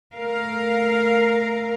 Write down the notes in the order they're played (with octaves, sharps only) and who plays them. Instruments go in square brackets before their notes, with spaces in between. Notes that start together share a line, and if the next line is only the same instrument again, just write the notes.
[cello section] A3 A#4 F5